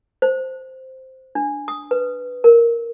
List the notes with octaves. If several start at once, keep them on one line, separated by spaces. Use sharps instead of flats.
C5
D4
D#6
B4
A#4